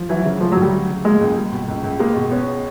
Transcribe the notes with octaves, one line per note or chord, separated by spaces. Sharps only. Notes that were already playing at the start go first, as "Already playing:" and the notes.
Already playing: F3
E3 F#3
C#3
F3 A3
F#3
D2 G3
F#3
C#3
G#3 A#3
C#2
G3
B2
C#2
C#2
G#3 A#3
B2
B3 C#4